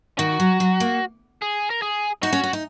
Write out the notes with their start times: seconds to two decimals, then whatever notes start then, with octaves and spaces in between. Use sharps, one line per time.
0.18 D#3 F#4
0.40 F#3
0.60 F#3
0.80 A#3
1.42 G#4
1.70 A#4
1.82 G#4
2.23 D#4 F#4
2.33 C#4
2.43 C#4
2.53 D#4